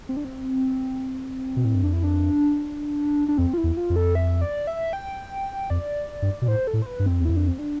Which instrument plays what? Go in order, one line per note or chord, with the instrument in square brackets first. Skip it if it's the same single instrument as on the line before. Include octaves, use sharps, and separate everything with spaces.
[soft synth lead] C4
D4
C4
[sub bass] B2
A2
G2
[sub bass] F2 [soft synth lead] D4
[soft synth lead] E4
D4
D4
[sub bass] F2 [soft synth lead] C4
[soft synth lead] F4
E4
[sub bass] E2
[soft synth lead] F4
[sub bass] F2
[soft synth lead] A4
E5
D5
E5
G5
[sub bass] F2 [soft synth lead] D5
[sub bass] G2
B2
[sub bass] A2 [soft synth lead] C5
[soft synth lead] A4
[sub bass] A2
[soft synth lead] C5
B4
[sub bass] G2
[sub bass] F2 [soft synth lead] C4
[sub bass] E2
[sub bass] F2 [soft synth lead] E4
[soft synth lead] D4
C4
D4